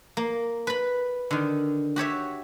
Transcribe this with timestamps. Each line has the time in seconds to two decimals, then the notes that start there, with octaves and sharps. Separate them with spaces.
0.17 A#3
0.67 B4 B5
1.31 D3 D#3
1.96 F#4 G4 C#5 E5